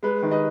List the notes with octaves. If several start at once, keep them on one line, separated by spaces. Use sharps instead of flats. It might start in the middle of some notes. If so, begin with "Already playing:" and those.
G#3 B4
D#3
B4 D#5